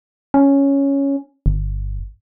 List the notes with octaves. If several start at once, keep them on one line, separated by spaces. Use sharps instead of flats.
C#4
G1